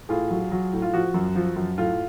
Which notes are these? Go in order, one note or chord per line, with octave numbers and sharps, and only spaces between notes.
A2 F4 G#4
F#3
F#3
A2
F4
F3 F#4
F#2
F3
F#2
A2 F4